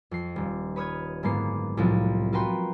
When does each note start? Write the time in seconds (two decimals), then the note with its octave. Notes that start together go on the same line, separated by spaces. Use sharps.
0.11 F2 C7
0.36 D#1
0.76 B4 C#5 D#6 F6 G#6
1.23 F#1 G#2 D3 A#3 B3 C7
1.77 C2 A2 F3 F#3
2.33 F4 F#4 A#4 B4 G5 C6